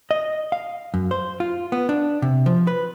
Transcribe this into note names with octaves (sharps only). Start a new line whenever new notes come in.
D#5
F5
F#2
C5
F4
B3
D4
C3
F3
B4